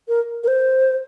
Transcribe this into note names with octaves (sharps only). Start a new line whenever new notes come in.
A#4
A#4
C5